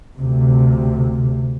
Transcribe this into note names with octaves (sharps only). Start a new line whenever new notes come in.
D2 C3